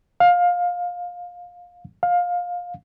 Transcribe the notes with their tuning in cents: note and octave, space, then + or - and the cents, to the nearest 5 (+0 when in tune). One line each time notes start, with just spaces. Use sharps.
F5 +20
F5 +20